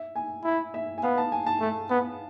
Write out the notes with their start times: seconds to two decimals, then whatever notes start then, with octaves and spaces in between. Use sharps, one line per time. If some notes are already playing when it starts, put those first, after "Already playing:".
Already playing: E5
0.16 G#5
0.44 E4
0.74 E5
0.98 G#5
1.03 B3 F5
1.18 A5
1.32 G#5
1.47 A5
1.61 A3
1.90 B3